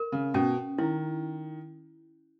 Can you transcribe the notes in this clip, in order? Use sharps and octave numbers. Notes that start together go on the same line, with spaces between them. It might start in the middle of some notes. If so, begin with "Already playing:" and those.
Already playing: A#4
C#3
B2 C#4
D#3 E4